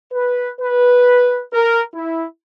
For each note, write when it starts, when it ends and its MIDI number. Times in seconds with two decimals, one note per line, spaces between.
0.12 0.50 71
0.60 1.40 71
1.53 1.82 70
1.94 2.24 64